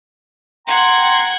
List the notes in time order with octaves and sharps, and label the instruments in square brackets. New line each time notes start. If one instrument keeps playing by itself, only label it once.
[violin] F#5 G#6 [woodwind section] G5 A#5 C6